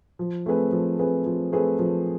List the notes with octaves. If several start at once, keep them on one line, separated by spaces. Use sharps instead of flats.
F3
A3 C4 G#4 B4
F3
A3 C4 G#4 B4
F3
A3 C4 G#4 B4
F3